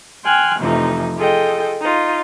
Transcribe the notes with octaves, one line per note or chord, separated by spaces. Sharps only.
G5 G#5 C6 F6 F#6
F2 C3 E3 F3 A3 D#4
F4 G#4 A4 D#5 G5
D#4 F4